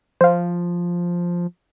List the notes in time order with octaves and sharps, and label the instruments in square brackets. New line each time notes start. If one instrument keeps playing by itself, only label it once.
[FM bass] F3 [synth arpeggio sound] C5 F5